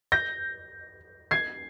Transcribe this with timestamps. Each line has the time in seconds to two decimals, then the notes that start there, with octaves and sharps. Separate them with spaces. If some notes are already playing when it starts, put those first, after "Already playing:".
0.12 G6 A#6
1.31 G#6 C7